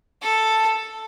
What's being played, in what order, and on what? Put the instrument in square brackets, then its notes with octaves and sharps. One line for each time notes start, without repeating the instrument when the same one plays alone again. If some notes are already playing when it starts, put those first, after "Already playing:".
[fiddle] A4